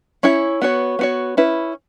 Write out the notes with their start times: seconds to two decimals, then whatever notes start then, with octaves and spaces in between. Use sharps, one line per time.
0.23 C#4 E4 C#5
0.62 B3 F#4 C#5
0.99 B3 F#4 C#5
1.37 C#4 E4 B4